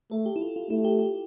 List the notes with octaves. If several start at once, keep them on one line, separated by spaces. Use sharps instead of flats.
A3 A4
G4
E4
F4
F4
A3 E4
G4
G4